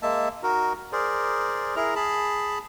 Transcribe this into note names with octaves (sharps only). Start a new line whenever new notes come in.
G#3 A#3 E5 A5
D#4 F#4 A#4
G#4 A#4 C5 D5
E4 G#4 A#4 A#5
G#4 A5 B5